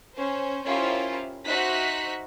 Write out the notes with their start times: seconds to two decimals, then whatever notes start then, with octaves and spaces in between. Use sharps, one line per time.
0.15 C#4 C5
0.65 C#4 E4 F4 G4 A#4 C5
1.46 D#4 F#4 C5 E5 F#6 B6